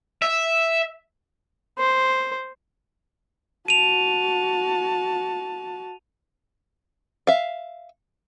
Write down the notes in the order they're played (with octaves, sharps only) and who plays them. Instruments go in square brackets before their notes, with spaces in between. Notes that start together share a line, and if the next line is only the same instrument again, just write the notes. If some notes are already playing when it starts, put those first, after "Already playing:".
[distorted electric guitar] E5
[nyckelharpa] C5
[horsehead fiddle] F#4 A5 [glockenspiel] D#7 F7
[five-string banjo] E5 F5